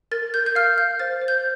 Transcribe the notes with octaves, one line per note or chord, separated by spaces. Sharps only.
A#4 A6
A#4 G6
G6
F5 F6
F5 G6
C5 A6
C5
G6